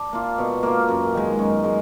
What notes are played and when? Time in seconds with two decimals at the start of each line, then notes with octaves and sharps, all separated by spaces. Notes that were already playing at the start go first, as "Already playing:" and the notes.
Already playing: D4
0.13 A#3 F4
0.38 B2
0.63 A#3 F4
0.89 F#2
1.14 D#3 G#3
1.39 F#2
1.64 G#3